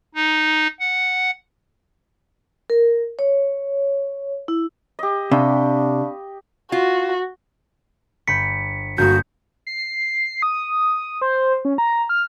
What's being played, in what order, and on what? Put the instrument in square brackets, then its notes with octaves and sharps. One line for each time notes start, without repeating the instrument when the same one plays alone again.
[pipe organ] D#4
F#5
[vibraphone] A#4
C#5
E4
[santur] G4 D#5
[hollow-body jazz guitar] C3 [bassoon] D4 [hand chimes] F5 B5 C#6
[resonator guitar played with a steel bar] F4 [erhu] F#4
[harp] G1 B5 G6 [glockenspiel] B6 C#7
[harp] G1 A#3 D#6 [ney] F#4 [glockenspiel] G6
[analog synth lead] C7
D#6
C5
C#4
A#5
F6